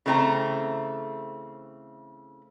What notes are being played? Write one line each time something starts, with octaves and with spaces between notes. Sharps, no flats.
C#3 E3 A3 C4 D#4 A#5